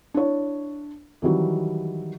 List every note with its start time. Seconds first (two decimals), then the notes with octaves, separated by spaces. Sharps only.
0.14 D4 E4 C#5
1.22 D#3 E3 F#3 G3